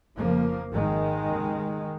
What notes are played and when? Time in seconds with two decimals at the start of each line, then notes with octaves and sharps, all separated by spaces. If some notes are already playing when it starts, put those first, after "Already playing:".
0.16 F1 F2 C#3 F3 A#3
0.71 G#1 G#2 D#3 G#3
1.26 F1 D#2 C#3